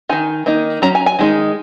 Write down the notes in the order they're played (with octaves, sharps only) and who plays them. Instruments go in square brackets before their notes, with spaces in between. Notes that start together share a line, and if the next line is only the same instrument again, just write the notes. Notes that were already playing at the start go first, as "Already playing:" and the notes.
[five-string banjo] D#3 F#3 D#4 G#5
D#3 A#3 D#4
F#3 C#4 A#5
G#5
G#5
D#3 G#3 D#4